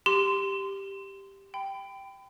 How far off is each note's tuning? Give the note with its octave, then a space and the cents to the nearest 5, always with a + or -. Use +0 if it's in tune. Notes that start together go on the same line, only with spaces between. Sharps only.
G4 +0 C6 -15
G5 +0 B5 +35